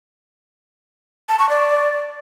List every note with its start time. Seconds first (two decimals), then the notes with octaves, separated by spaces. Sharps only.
1.29 A5
1.39 C#6
1.49 D5